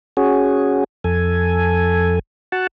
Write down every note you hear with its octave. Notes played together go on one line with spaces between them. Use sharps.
C#4 F#4 G#4
F2 A4 G#5
F#4 F#5 A5